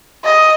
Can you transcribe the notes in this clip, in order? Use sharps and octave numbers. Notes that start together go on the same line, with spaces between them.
D#5